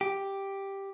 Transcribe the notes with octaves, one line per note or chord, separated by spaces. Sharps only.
G4